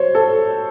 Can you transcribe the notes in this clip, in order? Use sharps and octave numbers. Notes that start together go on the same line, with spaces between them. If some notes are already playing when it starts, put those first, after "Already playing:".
Already playing: F#3 C5 C#5
A4